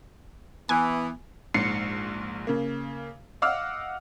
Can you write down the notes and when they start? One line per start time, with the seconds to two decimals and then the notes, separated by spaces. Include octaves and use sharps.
0.69 E3 B3 G#5
1.54 A#1 G#2 C7 C#7
2.47 C#3 A#3
3.42 D#5 F5 F#5 D6 E6 F6